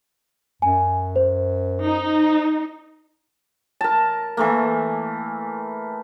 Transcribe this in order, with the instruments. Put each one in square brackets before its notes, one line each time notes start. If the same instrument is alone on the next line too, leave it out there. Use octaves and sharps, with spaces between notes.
[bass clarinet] F#2 [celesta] G#5
[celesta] C5
[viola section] D#4
[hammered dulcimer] A#4 A5
E3 A3 A#3